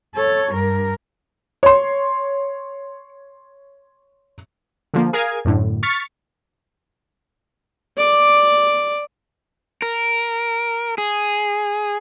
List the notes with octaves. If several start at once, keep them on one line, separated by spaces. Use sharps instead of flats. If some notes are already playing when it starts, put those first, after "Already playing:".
A4 C#5
G2 A#4
C#5 C6
D3 F3 A#3
G#4 A#4 F5 G#5 G#6
F#2 A2 D3
C#6 F6 A6 B6 C#7
D5 D6
A#4
G#4